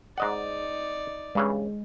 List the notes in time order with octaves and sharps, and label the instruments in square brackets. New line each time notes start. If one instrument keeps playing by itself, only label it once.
[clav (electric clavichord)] G#2 D#5 F#5 [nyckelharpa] D#4 D5
[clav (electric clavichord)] G2 C#3 E3 [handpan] G#3